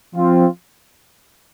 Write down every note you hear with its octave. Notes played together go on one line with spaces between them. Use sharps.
F3 C4 F4